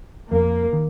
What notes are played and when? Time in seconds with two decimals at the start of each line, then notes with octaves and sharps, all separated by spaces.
0.31 F2 A#3
0.73 D#3